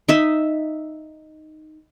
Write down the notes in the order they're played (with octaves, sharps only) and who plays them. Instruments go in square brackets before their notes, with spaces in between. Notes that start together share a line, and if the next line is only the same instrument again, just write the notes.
[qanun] D#4 E5